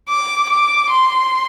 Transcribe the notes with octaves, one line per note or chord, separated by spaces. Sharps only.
D6
D6
C6